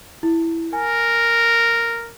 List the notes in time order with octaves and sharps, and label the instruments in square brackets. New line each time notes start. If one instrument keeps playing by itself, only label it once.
[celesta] E4
[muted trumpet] A#4 [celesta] G#5